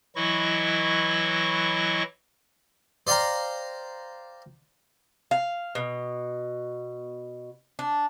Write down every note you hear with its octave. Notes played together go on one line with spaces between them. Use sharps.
E3 F#3 E4 D#5 C#6
C5 D5 F5 G5 A#5
F5
B2
D4